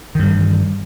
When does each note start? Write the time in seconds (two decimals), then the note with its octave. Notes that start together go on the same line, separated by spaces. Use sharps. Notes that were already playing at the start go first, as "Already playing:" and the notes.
0.15 D#3
0.19 G2
0.23 E3